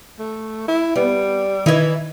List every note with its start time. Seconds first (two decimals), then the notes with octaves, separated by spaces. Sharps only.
0.19 A3
0.68 E4
0.96 G3 B3
1.66 D#3 E3 D#4 E4 G#6